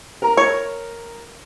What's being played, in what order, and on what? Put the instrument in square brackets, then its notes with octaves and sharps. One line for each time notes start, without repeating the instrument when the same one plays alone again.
[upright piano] A#4 A#5
[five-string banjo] C#5